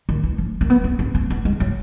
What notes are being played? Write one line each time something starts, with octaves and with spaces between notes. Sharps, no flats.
D#3
E3
F3
A#3
B3
B3
C4
C4
B3
G#3
F#3